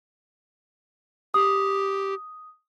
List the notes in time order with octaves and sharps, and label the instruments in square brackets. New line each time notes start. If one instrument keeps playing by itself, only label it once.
[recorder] G4 [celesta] D#6